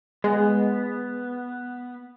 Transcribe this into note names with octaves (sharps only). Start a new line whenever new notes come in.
G#3 B3